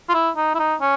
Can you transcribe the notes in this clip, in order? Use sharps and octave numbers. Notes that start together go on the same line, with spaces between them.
F4
E4
D#4
E4
D#4
C#4